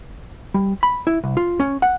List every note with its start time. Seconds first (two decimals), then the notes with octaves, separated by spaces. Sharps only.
0.54 G3
0.83 B5
1.07 E4
1.24 C2
1.37 F4
1.60 C#4
1.82 F#5